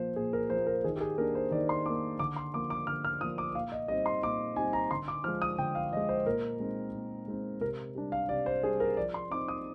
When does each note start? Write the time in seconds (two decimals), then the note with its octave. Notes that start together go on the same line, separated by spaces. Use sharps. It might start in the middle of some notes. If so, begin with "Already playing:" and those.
Already playing: A#2 F3 A#3 C5
0.16 A#2 G#4
0.33 A#4
0.50 F3 A#3 C5
0.67 A#4
0.84 D#3 G#4
0.96 G4
1.01 G#4
1.18 A#3 D4 A#4
1.35 C5
1.51 D#3 D5
1.69 C6
1.86 A#3 D4 D6
2.19 D3 D6
2.36 C6
2.54 F3 A#3 D6
2.70 D6
2.87 D3 F6
3.05 F6
3.21 F3 A#3 D#6
3.38 D6
3.55 A#2 F5
3.72 D#5
3.88 G3 C4 D#4 D#5
4.06 C6
4.23 A#2 D6
4.56 G3 C4 D#4 G#5
4.73 A#5
4.91 D3 C6
5.08 D6
5.24 F3 G#3 F6
5.42 D#6
5.58 D3 G5
5.75 F5
5.92 F3 D#5
5.97 G#3
6.09 C5
6.26 A#2 A#4
6.60 G#3 C4 D#4
6.94 A#2
7.28 G#3 C4 D#4
7.61 C3 A#4
7.95 G3 D4
8.12 F5
8.29 C3 D5
8.46 C5
8.63 G3 D4 G#4
8.80 A#4
8.97 F3 D5
9.14 C6
9.30 C4 D#4 D6
9.48 D#6